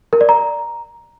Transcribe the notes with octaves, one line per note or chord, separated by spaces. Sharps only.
A#4
D5
A#5